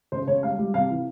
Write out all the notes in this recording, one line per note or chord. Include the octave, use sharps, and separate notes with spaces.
C#3 C5
C#3 C#5
G3 F5
G3
C3 F5
E3